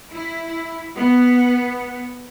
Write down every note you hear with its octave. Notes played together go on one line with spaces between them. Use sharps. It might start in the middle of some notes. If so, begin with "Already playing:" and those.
E4
B3